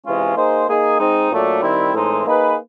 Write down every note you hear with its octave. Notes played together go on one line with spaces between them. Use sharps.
C3 E3 G#3 C#4 F4
A#3 D#4 G#4 C5
A#3 D#4 G#4
G#3 C4 D#4
A#2 F#3 A3 D4
D#3 G3 C4 E4
A2 E3 G#3 C4 D#4
A#3 D#4 G#4 B4